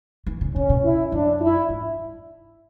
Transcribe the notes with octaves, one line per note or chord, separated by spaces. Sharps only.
E3
C#3
C#3 C#4
B2
E4
F#2 D4
E4
G#2